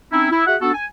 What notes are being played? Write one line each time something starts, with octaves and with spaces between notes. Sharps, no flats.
C4 C#4 D#4 E4
E4
F#4 G#4 E5 F#5
B3 D4 F#4 A4
G#5